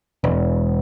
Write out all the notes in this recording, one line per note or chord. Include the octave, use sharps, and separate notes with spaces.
E1